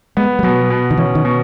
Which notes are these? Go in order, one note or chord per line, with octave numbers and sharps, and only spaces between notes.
G#3 B3
G#3
B2 F#3
B2
D#3
E3 C#4
D#3
B2